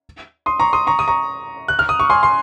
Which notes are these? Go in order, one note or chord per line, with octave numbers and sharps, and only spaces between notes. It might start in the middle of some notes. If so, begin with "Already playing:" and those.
C6 D#6
A#5 C#6
C6 D#6
A#5 C#6
D#6
A#5 C#6
F#6
F6
D#6
C#6
G#5 C6
C6